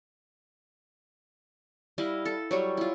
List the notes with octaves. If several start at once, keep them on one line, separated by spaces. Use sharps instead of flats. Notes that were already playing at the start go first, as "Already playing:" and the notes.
G3 E4 D#5 F5
A4
F#3 G3 C#5
E4 F4